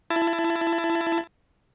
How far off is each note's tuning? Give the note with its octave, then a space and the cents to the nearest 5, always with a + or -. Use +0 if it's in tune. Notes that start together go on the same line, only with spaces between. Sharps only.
E4 +25 A5 +10